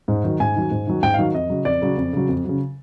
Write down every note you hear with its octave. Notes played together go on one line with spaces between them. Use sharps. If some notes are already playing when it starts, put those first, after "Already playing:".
G#2
D#3 F#3
G#2 G#5
D#3 F#3
G#2
D#3 F#3
G#2 G5
D#3 F#3 F5
F2 D#5
C#3 F#3
F2 D5
C#3 F#3
F2
C#3 F#3
F2
C#3 F#3